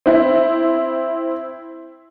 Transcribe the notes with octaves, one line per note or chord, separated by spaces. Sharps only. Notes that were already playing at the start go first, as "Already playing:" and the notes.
C4 E4